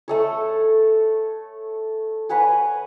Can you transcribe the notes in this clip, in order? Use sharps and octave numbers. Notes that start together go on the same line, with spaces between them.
A3 A4 C#5
B4 C#5 F#5 G#5